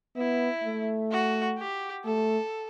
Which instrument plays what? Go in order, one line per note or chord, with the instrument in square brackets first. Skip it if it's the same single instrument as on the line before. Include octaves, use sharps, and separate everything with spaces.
[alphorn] B3 [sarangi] E4
[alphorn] A3
[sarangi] F#4
G4
[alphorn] A3 [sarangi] A4